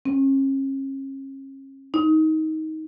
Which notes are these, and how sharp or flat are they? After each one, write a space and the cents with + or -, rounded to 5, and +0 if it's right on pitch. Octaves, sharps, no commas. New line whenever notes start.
C#4 -40
D#4 +20